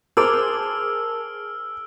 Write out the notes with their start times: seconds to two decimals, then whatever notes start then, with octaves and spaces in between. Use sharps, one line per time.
0.17 G#4 A#4 C5 A5 D6 E6 F6 D7